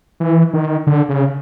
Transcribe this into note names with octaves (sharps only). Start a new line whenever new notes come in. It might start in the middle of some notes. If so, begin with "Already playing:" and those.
E3
D#3
D3
C#3